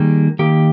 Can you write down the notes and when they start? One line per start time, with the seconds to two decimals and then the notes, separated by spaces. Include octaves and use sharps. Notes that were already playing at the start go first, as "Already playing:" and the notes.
Already playing: D#3 G3 A#3 G#4
0.39 D#3 A#3 G4